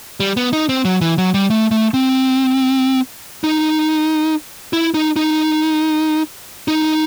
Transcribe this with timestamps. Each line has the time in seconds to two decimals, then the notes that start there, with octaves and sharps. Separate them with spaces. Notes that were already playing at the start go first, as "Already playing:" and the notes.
0.20 G3
0.37 B3
0.53 D#4
0.69 C4
0.85 F#3
1.01 E3
1.18 F#3
1.34 G3
1.50 A3
1.71 A3
1.94 C4
3.44 D#4
4.73 E4
4.94 D#4
5.16 D#4
6.68 D#4